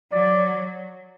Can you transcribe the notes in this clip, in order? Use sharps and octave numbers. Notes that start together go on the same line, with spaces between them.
F#3 D5